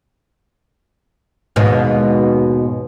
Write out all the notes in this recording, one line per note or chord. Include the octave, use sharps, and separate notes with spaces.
D#2 G#2 B2